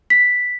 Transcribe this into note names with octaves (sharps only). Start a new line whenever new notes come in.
B6